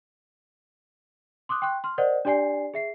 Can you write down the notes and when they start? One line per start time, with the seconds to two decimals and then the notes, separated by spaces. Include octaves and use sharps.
1.49 C6 D6 D#6 F#6
1.62 G5 C6 C#6 F#6
1.84 C6 F6
1.98 A#4 C5 D5 D#5 F#5
2.25 D4 G4 D5 G#5 C7
2.74 G#4 E5 C7